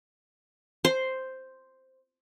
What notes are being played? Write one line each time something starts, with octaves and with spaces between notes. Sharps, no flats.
C5